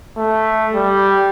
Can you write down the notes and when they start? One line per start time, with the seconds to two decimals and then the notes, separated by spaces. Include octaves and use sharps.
0.17 A3
0.74 G3